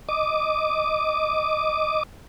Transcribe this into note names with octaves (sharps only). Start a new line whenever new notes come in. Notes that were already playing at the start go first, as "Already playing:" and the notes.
D#5 D6